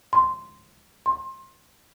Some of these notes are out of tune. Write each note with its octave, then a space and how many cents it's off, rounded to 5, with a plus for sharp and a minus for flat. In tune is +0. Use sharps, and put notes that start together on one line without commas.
C6 -5
C6 +25